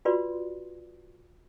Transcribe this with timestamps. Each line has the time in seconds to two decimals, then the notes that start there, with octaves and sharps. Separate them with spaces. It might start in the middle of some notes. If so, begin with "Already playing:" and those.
0.05 F4 F#4 B4 D5 C6